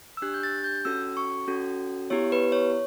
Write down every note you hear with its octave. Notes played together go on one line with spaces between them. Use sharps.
E6
D4 G4 F#6
G6
A6
G6
C#4 F#4 A4 E6
C#6
C#4 F#4 A4
B3 E4 G4 C#5
B4
C#5